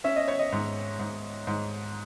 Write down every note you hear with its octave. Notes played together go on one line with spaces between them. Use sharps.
C#4 E5
D#5
C#5
D#5
G#2
G#2
G#2